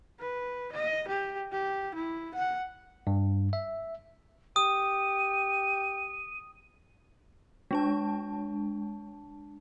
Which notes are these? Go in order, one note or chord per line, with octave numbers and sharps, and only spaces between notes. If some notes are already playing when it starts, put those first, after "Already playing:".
B4
D#5
G4
G4
E4
F#5
G2
E5
G4 D#6 D#7
G#3 D4 A5